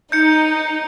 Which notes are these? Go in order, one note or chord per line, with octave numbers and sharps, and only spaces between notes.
D#4 G6 C#7